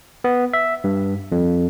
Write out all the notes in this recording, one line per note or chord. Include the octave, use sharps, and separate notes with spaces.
B3
E5
G2
F2